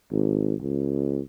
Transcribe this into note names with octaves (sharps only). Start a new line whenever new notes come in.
G#1
C#2